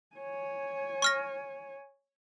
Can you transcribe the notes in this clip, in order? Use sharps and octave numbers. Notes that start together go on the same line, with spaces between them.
C#5 G#5
C#6 F6 A#6